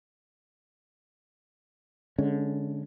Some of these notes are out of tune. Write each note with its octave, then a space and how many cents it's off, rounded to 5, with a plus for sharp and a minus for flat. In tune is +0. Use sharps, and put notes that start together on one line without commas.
D3 -15 G#3 +0 C#4 +0